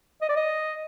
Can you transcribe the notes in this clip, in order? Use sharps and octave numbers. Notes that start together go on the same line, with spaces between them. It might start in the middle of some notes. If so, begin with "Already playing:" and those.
D#5
D5
D#5